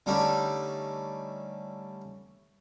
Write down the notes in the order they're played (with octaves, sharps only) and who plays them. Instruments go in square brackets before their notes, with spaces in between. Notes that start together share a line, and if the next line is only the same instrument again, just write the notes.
[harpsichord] D3 G3 A3 C#4 D#4 G4